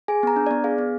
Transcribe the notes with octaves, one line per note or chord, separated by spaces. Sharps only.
G#4 G#5
B3 A#5
D4
B3 D5
G#4 F5
B3